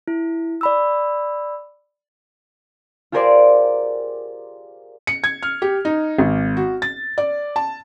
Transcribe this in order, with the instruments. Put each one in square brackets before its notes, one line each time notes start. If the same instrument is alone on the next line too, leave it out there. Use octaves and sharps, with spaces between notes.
[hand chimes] E4
D5 B5 E6
[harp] F4 G4 G#4 A#4 C5 D5
[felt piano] C#7
G#6
F6
G4
D#4
G#1
F#4
A6
D5
A5